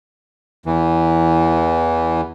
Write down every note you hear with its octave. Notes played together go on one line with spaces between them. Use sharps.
E2 E3